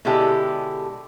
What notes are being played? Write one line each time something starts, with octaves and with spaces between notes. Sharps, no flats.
B2 D3 G#3 E4 G4 A4